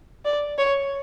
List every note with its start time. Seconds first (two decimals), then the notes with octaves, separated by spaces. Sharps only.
0.25 D5
0.59 C#5